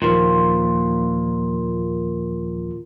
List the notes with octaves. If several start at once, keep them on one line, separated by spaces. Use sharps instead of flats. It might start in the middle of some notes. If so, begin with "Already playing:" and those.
D#2 A#2 D#3 F3